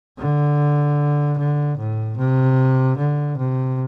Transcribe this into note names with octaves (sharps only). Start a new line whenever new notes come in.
D3
D3
A2
C3
D3
C3